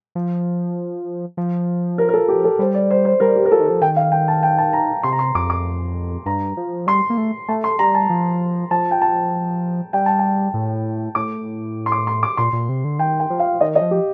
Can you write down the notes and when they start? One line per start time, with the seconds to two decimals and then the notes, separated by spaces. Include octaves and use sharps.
0.15 F3
1.37 F3
1.98 A#4
2.09 A#4
2.14 A4
2.28 G4
2.44 A4
2.59 G3 C5
2.74 D5
2.91 C5
3.05 C5
3.20 G3 A#4
3.36 G4
3.46 A#4
3.52 F3 A4
3.60 D#3
3.67 A#4
3.70 F3
3.82 D#3 G5
3.97 F5
4.12 G5
4.28 A5
4.43 G5
4.58 A5
4.73 A#5
5.03 C3 C6
5.13 A#5
5.19 C6
5.35 F2 D6
5.50 D6
6.26 G2 A#5
6.57 F3
6.87 G3 C6
7.10 A#3
7.18 A3
7.48 A3 A5
7.64 C6
7.79 G3 A#5
7.95 A5
8.10 F3
8.71 F3 A5
8.91 G5
9.02 A5
9.93 G3 G5
10.06 A5
10.19 G5
10.54 A2
11.15 A2 D6
11.86 C6
11.92 D6
12.07 C6
12.23 D6
12.37 A#2 C6
12.53 A#2
12.69 C3
12.84 D3
12.99 D#3 G5
13.20 G5
13.30 F3
13.39 F5
13.61 D#3 D#5
13.75 D#5
13.81 F3
13.91 G4